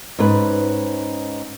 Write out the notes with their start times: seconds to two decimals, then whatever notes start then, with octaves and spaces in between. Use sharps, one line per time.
0.19 G#2 C#4 B4